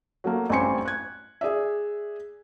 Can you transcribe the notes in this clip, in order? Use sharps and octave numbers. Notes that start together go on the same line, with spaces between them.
F#3 A3 A#3
A1 G2 C4 G#5 C6 C#7
F#6 G#6
G#4 D5 E5